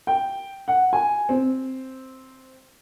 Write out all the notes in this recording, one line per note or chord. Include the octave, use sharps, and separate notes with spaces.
G5
F#5
G#5
C4